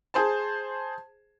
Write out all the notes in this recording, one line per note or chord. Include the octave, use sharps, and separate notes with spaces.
G#4 C5 A5